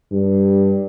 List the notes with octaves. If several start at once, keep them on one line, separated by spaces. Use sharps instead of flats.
G2